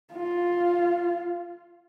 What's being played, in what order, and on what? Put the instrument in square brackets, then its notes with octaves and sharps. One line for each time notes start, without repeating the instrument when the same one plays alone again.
[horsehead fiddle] F4